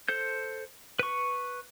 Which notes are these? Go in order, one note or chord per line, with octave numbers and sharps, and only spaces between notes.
A4 C5 G6
B4 C#6